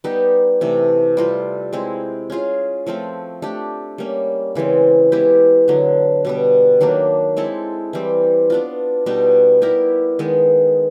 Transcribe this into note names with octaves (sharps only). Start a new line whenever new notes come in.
G3 B3 D#4 G4
C3 E3 A3
G3 C4 F4 A4
G#3 C4 E4
C#4 F4 G#4
F3 A3 C4 F4
A3 D4 G4
G3 A#3 C#4
C#3 E3 G#3 C4
G#3 B3 E4 G4
D3 F#3 B3
B2 G3 B3
D#3 F#3 A#3 D4
G#3 C4 E4 A4
E3 G3 C4
B3 D4 F4
B2 G3 B3 D#4
B3 E4 G4 A#4
D#3 G#3 B3